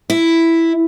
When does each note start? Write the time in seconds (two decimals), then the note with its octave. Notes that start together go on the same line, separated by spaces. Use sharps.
0.10 E4